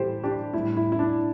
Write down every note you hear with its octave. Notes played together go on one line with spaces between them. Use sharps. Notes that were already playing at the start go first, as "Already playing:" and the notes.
Already playing: A2 E3 G3 E4 G4 A4 C5
D4 G4
A2 G3 E4
E4
E4
D4